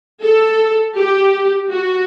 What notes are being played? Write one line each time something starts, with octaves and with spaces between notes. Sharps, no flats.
A4
G4
F#4